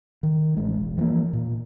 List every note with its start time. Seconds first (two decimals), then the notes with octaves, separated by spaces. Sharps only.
0.23 D#3
0.57 A1 G#3
0.77 E1
0.98 E3 F3 G#3 A#3
1.33 A#2